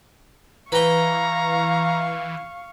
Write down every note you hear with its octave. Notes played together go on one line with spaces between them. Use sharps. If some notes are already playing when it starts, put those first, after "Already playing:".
E3 B4 F5 G5 A#5 C#6